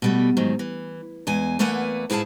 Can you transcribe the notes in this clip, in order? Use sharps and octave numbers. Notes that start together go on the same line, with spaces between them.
B2 G3 A3
G#2 D#3 F#3
E3
E2 G#3 G#5
E2 A3 A#3 B4 F#5 G#5
G#2 E4 G#4 F5 A5